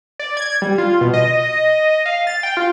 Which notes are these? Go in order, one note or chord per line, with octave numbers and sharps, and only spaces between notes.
D5
G#6
G3
F4
B2
D#5
F5
A6
G5
F4